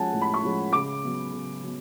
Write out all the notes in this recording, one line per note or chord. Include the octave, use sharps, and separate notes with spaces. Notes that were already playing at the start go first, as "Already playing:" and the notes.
Already playing: F3 G#3 C#4 F#5 G#5 A5
A2
B5
C#6
F3 G#3 C#4
C#3 D6
F#3 B3
C#3
F#3 B3